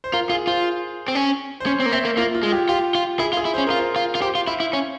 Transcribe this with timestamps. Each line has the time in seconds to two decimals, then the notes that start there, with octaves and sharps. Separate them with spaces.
0.04 C5
0.13 F4 A#4
0.30 F4 G#4
0.47 F4 C5
1.08 C4
1.15 C#4
1.60 C5
1.66 C#4 C#5
1.80 C4
1.86 A#3
1.92 C4 E5
2.05 A#3
2.17 A#3 F4
2.35 F4
2.43 G#3
2.52 G4
2.69 F4 G4
2.95 F4
3.19 E4 G#4
3.33 F4
3.37 G#4
3.45 E4
3.54 C#4 C5
3.67 F4 A#4
3.79 C5
3.96 F4
4.15 F4
4.22 G4 C5
4.35 F4
4.47 E4 F5
4.60 E4
4.73 C#4